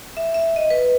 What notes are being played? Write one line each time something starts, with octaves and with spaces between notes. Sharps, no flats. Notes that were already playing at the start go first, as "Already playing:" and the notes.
E5
E5
D#5
B4